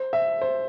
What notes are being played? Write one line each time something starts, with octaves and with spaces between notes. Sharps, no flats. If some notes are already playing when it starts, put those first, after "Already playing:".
Already playing: C5
E5
C5